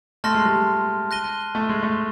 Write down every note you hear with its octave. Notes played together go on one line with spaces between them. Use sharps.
A3 A5 C6 F6 A#6
G#3
G3
G#3
F#6 A#6 D#7 G7
A3
G#3
A3